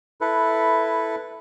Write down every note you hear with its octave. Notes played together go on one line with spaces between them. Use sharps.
E4 A4 B4